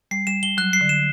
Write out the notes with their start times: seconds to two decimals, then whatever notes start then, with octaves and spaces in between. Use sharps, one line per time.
0.11 G3 C7
0.27 G3 E7
0.43 G3 G7
0.57 F#3 F#6
0.73 C7
0.81 D3
0.89 E7